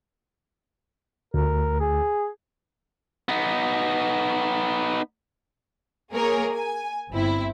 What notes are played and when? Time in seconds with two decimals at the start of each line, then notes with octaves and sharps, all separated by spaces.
1.34 D2 A#4
1.80 G#4
3.29 B3 D#4
6.12 A#3 G#4 A#4 C#5
6.52 G#5
7.10 G1 C4 E4